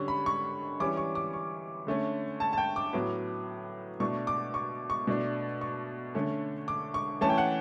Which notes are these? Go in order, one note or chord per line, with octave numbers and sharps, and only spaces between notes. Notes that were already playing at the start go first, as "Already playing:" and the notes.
Already playing: D3 G3 C#4 C#6
B5
C#6
E3 G3 C#4 D6
C#6
D6
C#6
D3 A3 C#4
A5
A5
G5
D6
A2 F#3 B3
B2 A3 D4 C#6
D6
C#6
C#6
B2 A3 D4
C#6
D3 A3 C#4
D6
C#6
E3 A3 C#4 A5
G5
F#5